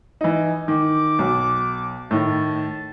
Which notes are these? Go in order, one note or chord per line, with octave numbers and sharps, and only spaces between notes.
E3 D#4
D#3 D6
B1
A2 D#3 A5